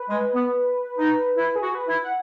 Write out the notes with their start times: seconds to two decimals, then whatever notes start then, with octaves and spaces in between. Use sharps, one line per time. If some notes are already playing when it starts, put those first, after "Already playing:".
Already playing: B4
0.10 G#3
0.35 B3
0.99 D#4
1.36 E4 B4
1.56 G#4
1.62 F#4
1.75 B4
1.88 E4
2.03 F#5